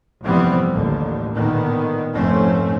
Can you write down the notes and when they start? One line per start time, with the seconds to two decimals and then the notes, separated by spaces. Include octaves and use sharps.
0.23 F1 G2 E3 G3 B3 C4
0.72 A1 D#2 D3
1.35 A#2 D3 D#3 B3
2.14 F1 G#2 A3 C4 C#4